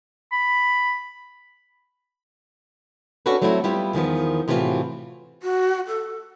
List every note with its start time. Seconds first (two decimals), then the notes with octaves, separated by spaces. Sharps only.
0.32 B5
3.26 C#4 D4 F#4 A4 B4
3.42 F#3 A3 C4 D4 E4 F#4
3.64 G3 B3 E4 F4 G4
3.93 E2 D#3 F3 B3
4.48 A2 C3 E3 D4 F4 F#4
5.43 F#4
5.87 A4